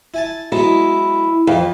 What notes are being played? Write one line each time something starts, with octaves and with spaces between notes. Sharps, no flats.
E4 G#5 A5
F#3 G#3 B3 E4
F2 E3 F3